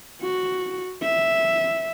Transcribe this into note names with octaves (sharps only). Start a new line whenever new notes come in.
F#4
E5